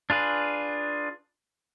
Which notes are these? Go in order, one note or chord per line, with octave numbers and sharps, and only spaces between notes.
D4 F4 G#4 B4